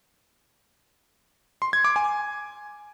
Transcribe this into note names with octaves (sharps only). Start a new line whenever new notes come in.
C6
G#6
D6
G#5